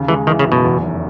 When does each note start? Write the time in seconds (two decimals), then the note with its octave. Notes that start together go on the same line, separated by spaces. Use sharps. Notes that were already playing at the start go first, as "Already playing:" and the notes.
Already playing: D#2 C#3
0.08 E3 G#3
0.27 D#3 E3
0.39 C#3
0.46 F#2
0.52 B2
0.64 E2
0.83 F1